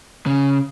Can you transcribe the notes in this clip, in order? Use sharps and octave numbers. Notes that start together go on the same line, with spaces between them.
C#3